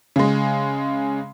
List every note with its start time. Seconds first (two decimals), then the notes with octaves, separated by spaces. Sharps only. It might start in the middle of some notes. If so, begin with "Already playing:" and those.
0.16 C#3 G#3